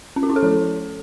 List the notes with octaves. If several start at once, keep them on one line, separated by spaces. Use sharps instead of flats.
C#4
F#4
E4
A4
F3